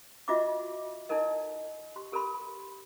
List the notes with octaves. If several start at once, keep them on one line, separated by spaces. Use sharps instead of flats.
F4 F#4 D#5 E5 D6
D#4 E4 A4 A#4 D#5
G4 C6
G4 A4 A#4 D5 B5 C6